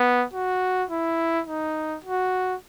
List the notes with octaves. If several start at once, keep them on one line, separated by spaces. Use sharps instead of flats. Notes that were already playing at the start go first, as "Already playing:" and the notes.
Already playing: B3
F#4
E4
D#4
F#4